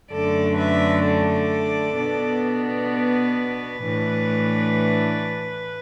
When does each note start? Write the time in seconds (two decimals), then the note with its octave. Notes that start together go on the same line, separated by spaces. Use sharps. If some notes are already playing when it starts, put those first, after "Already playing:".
0.10 F#2 D3 A3 D4 A4 D5
0.57 B4 E5
1.04 A4 D5
1.97 B2 B3 D4
2.89 B4
3.82 A2 E3 A3 D4